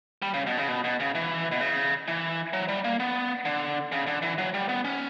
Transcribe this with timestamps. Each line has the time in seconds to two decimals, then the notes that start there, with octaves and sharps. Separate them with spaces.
0.22 G3
0.34 C#3
0.47 B2
0.58 C#3
0.68 B2
0.84 B2
1.00 C#3
1.15 E3
1.51 B2
1.61 C#3
2.08 E3
2.53 F#3
2.69 G3
2.84 A#3
3.00 B3
3.45 D3
3.92 C#3
4.07 D3
4.22 E3
4.38 F#3
4.54 G3
4.69 B3
4.85 C#4